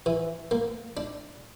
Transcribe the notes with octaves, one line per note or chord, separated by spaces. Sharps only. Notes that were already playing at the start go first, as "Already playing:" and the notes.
E3
A#3
D4